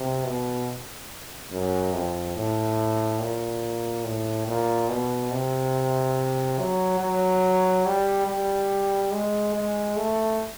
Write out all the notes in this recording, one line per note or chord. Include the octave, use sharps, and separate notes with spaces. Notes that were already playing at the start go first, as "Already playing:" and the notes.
Already playing: C3
B2
F#2
F2
A2
A#2
A2
A#2
B2
C3
F#3
F#3
G3
G3
G#3
G#3
A3